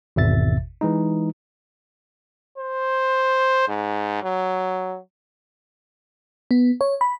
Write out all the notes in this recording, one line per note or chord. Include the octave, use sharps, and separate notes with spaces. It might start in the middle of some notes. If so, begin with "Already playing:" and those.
G#1 E2 B2 E5 A6
E3 G#3 D#4
C5
G#2
F#3
B3
C#5
B5